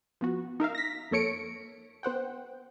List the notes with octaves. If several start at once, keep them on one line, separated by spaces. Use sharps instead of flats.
F3 B3 F#4
D#4 A#4 E5 F5
A#6 B6
F2 A#3 A4 C#5 C#7 D7
B3 C5 F#5 G5